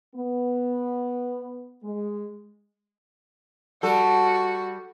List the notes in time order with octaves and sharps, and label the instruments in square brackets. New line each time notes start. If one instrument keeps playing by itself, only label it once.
[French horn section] B3
G#3
[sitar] G3 A4 [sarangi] F#4